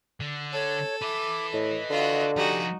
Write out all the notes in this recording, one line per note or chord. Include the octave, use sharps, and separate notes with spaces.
D3
A4 C#5
B4 E5 D6
A2 D#5
D3 F4 F#4
F3 D#4 F#4 G4 G#5